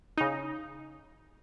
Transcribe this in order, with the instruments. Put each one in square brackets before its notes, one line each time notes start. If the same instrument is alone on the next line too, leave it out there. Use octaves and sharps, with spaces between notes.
[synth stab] C#3 D#4